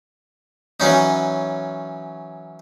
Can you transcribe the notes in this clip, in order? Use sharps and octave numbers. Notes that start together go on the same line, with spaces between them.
E3 F#3 C#4 D#4